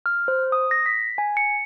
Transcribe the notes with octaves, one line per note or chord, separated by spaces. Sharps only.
F6
C5
D#6
A#6
B6
G#5
C#7